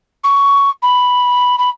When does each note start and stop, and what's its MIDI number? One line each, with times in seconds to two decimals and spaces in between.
0.24 0.70 85
0.82 1.56 83
1.58 1.69 83